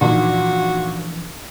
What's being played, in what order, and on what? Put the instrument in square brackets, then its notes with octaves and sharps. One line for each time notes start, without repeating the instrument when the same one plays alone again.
[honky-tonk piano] A#2 A#3 D#4 [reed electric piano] E3 F3 D4 [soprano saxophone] F#4